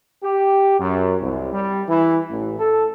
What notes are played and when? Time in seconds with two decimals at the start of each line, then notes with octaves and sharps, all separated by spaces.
0.23 G4
0.80 F#2
1.21 C2
1.52 G3
1.88 E3
2.29 A1
2.59 A4